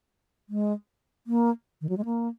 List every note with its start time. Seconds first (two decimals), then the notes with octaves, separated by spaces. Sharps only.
0.49 G#3
1.27 A#3
1.81 D#3
1.89 F#3
1.98 G#3
2.05 A#3